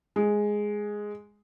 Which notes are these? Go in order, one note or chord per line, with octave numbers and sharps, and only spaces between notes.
G#3